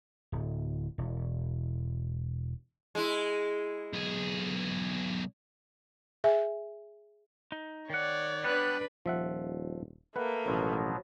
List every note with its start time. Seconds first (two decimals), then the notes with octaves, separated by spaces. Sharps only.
0.32 D1
0.98 E1
2.95 G#3 E4
3.94 B1 G#4
6.24 G#4 E5 G#5
7.52 D#4
7.90 D#3 C#5 D5 F#5
8.44 G3 B3 D4 B4 F#6
9.06 D#1 F3 E5 F#5
10.16 A3 A#3 B4 F#5
10.46 A1 B2 F3 F#3